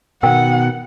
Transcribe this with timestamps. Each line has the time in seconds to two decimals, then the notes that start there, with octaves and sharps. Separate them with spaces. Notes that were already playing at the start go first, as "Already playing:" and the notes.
0.23 B2 D#3 A#4 F#5 G5